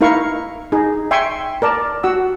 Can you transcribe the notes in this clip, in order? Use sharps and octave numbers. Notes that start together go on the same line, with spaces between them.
D#4 E4 A#4 F5 C#6
D#4 G#4
E5 G5 G#5 C6 C#6
A#4 D5 A5
F#4 F#5 E6